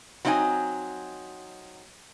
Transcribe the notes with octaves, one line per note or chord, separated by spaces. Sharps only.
F#3 C4 D#4 D#5 G#5